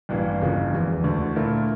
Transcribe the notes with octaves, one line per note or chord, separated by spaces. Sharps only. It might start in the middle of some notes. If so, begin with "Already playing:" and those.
A1 G2 E3 A#3
G1 F2 C#3 F3 A#3
E1 E2 E3
D2 D3 A3 D4
A#2 A3 E4 A#4